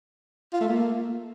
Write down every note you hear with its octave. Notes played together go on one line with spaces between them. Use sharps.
F4
A3
A#3